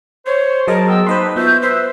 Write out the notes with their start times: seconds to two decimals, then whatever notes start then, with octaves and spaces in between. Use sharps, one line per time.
0.26 C5 C#5
0.68 F#3 G#4 A#4 D#5 A5
0.89 B3 G5 E6
1.07 A#3 D#4 B4 C5 D#5 A5 C6
1.36 B3 F4 F#4 E5 G6
1.62 B4 C5 E5